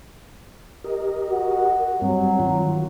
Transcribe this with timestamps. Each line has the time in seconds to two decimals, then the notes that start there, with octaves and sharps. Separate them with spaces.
0.84 G4 A#4 D#5
1.30 F#4
2.01 G2 F#3 G3 C4
2.40 D#3 F4